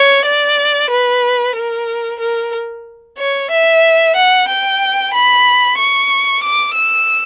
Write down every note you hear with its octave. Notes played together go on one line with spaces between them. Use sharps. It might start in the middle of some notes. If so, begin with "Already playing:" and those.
Already playing: C#5
D5
B4
A#4
A#4
C#5
E5
F#5
G5
B5
C#6
D6
E6